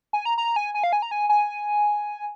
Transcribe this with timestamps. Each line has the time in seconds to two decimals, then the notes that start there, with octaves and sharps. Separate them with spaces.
0.13 G#5
0.25 A#5
0.38 A#5
0.56 G#5
0.75 G#5
0.84 F5
0.93 G#5
1.02 A#5
1.11 G#5
1.29 G#5